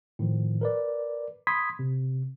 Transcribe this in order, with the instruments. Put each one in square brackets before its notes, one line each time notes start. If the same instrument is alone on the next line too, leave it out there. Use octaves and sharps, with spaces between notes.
[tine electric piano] A2 D#3 F3
A#4 B4 D5
B5 C6 D#6 G#6 B6
C3